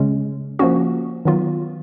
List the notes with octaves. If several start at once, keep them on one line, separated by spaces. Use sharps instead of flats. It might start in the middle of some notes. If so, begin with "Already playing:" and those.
Already playing: C#3 G#3 C#4
F3 A#3 C#4 F#4
D#3 F#3 B3 F4